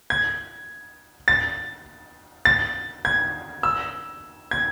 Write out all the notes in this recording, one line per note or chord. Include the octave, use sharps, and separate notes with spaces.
G#6
A6
A6
G#6
E6
G#6